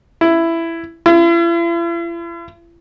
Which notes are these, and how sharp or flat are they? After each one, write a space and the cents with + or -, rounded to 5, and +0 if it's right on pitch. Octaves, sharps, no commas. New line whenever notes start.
E4 +10
E4 +45